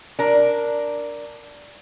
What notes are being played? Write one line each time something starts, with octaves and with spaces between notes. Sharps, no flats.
D4 A#4